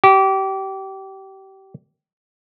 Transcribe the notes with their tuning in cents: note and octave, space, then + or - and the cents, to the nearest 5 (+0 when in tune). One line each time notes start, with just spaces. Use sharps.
G4 -25